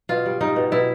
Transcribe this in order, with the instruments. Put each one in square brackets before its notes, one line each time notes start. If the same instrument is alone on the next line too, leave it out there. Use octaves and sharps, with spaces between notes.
[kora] B2 F4
G3
G3 D#4
B2
B2 E4